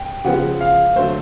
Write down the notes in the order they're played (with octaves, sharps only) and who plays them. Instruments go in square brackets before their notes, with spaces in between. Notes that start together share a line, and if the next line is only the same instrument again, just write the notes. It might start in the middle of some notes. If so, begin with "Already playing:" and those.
Already playing: [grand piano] G5
[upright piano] C#3 F3 G#3 B3 [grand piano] F#5
[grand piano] F5
[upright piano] D3 F#3 A3 [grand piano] C5